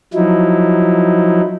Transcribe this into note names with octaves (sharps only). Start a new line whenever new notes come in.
F3 F#3 D#4 E4